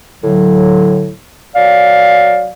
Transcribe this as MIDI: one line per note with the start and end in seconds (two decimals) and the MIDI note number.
0.23 1.11 45
0.23 1.11 50
0.23 1.11 54
1.56 2.49 54
1.56 2.49 74
1.56 2.49 77